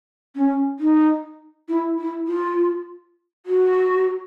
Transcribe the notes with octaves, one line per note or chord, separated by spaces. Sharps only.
C#4
D#4
E4
E4
F4
F#4